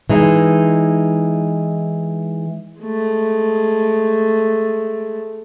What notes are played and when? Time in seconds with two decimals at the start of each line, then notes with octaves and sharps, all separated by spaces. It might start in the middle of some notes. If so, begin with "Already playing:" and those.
0.10 E3 G#3 D#4
2.81 G#3 A3